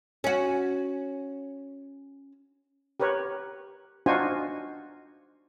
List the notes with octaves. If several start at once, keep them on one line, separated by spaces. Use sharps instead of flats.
C#4 F#4
G4 A#4 B4 C#5
D4 D#4 F4 F#4 C5 G#5